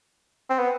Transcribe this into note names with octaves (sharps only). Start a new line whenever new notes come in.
C4
B3